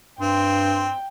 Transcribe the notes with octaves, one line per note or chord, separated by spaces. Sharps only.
G2 C4 G5 C6